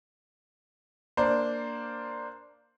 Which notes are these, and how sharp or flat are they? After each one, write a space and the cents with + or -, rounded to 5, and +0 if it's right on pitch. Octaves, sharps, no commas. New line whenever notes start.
A#3 +0 D4 +0 C5 +0